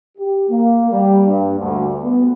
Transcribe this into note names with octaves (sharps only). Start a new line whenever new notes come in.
G4
A#3
G3
G2
D2
B3